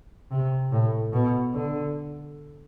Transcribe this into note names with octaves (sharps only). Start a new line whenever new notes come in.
C3
A2
B2
D3